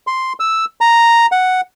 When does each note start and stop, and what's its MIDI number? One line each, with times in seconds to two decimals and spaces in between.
0.07 0.33 84
0.40 0.65 88
0.81 1.26 82
1.32 1.61 78